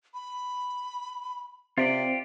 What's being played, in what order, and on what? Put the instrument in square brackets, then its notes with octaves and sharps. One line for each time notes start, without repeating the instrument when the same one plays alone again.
[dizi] B5
[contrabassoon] C3 [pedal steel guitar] F4 G4 D5